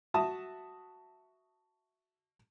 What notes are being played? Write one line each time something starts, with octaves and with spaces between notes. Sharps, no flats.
F#4 E5 A5 D#6